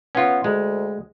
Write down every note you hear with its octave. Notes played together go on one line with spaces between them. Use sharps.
B3 C#4 F4
D2 G#3